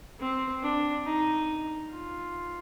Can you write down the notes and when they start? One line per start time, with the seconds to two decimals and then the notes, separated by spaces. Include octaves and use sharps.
0.19 C4
0.62 D4
1.05 D#4
1.92 F4